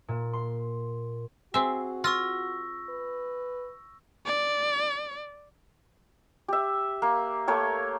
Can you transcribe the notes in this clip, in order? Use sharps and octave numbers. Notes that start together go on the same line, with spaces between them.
A#2
C6
C4 F#4 G#4 E5
F4 C#6 E6 A#6
B4
D5
G4 E5
A#3
A3 A#3 C#5 G5